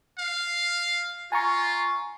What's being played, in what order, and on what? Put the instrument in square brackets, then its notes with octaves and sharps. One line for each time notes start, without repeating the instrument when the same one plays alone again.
[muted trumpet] F5
[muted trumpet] F4 [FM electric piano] G#5 A#5 C#6